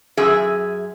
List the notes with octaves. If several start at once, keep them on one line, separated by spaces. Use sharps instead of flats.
F#2 G#4 E5